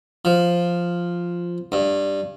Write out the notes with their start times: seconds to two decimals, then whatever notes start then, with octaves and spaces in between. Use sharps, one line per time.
0.25 F3
1.72 G2